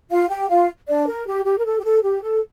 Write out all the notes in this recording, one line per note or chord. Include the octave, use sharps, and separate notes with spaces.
F4 F5
G4 G5
F4 F5
D4 D5
A#4
G4
G4
A#4
A4
G4
A4
G4
A4